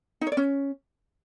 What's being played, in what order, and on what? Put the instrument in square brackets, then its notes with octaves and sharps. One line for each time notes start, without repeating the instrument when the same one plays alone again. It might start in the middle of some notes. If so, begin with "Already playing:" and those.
[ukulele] D#4
C#5
D5
C#4